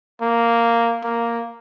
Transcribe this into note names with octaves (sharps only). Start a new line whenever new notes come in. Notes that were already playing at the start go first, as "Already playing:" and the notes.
A#3
A#3